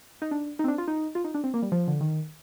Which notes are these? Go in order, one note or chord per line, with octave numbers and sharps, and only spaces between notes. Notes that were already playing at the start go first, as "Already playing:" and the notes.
D#4
D4
D#4
C4
D4
F4
D#4
F4
D#4
D4
C4
A#3
G3
F3
D3
D#3